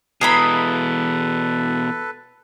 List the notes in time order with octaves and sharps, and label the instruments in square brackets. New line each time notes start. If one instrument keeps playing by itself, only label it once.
[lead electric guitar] B2 E3 [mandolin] G#4 A#5 B5 [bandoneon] A4 B4